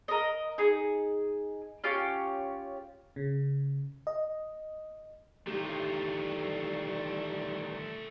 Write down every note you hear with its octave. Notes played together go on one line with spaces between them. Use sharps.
A#4 D#5
D#4 G#4
C#4 F4 G4
C#3
D#5
D#3 E3 G3 A3 F4 G4